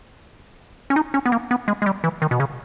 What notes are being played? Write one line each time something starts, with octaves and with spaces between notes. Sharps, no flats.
C#4
D#4
C#4
B3
A#3
B3
G#3
G#3
G3
E3
D#3
B2
C#3